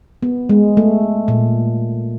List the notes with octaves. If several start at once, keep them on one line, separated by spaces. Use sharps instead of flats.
B3
G#3
A3
A#2